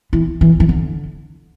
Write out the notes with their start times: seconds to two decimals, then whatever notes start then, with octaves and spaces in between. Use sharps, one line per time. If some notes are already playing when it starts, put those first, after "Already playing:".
0.13 E3
0.41 E3
0.60 E3
0.69 D3